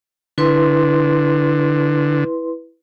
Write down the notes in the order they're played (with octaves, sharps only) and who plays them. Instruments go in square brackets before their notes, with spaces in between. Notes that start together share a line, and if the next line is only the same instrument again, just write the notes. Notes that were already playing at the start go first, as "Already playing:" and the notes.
[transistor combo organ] D3 [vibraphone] E4 B4 C6